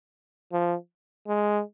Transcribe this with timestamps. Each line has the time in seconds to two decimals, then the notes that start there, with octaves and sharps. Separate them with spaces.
0.52 F3
1.27 G#3